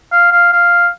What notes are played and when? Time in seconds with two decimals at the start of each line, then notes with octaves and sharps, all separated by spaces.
0.12 F5
0.32 F5
0.53 F5